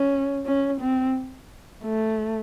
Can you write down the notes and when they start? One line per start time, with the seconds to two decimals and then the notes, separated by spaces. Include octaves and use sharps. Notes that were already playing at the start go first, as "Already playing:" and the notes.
Already playing: C#4
0.46 C#4
0.80 C4
1.84 A3